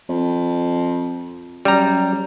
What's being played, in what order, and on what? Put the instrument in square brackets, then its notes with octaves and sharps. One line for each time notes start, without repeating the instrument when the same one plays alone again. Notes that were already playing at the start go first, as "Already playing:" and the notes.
[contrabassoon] F2
[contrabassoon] F#2 [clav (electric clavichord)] G3 A#5